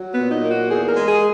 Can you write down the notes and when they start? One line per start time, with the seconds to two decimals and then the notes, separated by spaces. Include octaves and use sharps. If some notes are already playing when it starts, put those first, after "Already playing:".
Already playing: F#3
0.13 B3
0.18 A#2
0.31 D#4
0.44 A#3
0.50 F#4
0.69 E2 G#4
0.88 A#4
0.94 G#3
1.07 G#4